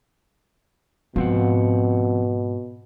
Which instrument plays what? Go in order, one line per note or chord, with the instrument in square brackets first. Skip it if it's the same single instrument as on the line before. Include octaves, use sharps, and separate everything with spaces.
[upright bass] G#2 [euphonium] B2 [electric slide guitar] F3 C4 F#5